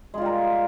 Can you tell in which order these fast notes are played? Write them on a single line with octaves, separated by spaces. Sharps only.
G#3 F4 G3 A#4